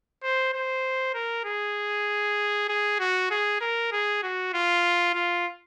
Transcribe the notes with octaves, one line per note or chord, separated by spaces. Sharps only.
C5
C5
A#4
G#4
G#4
F#4
G#4
A#4
G#4
F#4
F4
F4